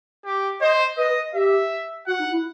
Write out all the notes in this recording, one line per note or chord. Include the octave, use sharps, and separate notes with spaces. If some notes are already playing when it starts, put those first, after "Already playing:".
G4
C5 D#5
B4 D#5
G4 E5
F#4 F#5
D#4
E4